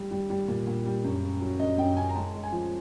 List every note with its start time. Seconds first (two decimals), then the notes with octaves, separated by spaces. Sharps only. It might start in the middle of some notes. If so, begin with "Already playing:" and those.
Already playing: G3
0.11 G3
0.30 G3
0.48 A#2
0.67 A#2
0.86 G3
1.04 F#2
1.23 C#3
1.41 F#3
1.59 F#2 D#5
1.78 F#2 G5
1.97 C#3 G#5
2.09 A#5
2.15 G#3 A5
2.34 G#3
2.43 G#5
2.52 F3